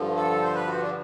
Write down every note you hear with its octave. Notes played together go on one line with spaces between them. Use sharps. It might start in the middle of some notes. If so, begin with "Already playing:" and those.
Already playing: G2 D3 F3
A4
C5
B4
F#4
D4